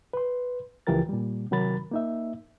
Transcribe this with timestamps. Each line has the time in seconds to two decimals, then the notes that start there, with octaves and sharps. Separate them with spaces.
0.13 B4 C6
0.87 C#2 E3 F3 G4 A#4 A6
1.09 A#2 G3
1.51 C3 D#3 F#3 A#4 B5 A6
1.91 A#3 D#4 E5